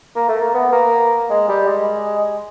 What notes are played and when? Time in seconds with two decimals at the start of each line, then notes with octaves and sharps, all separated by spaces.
0.16 A#3
0.28 A3
0.41 A#3
0.54 B3
0.72 A#3
1.30 G#3
1.49 G3
1.67 G#3